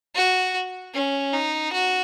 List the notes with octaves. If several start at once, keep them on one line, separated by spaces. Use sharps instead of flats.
F#4
C#4
D#4
F#4